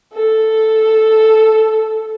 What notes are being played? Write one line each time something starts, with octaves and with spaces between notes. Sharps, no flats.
A4